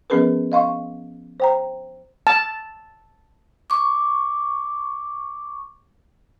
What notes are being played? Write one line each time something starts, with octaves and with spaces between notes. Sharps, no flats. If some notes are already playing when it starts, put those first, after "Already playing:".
F3 B3 C#4 G#4 A#4 B4
D#5 F5 C6 C#6
C5 G5 A#5
A5
C#6 D6